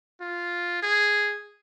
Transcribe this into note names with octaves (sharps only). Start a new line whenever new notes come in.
F4
G#4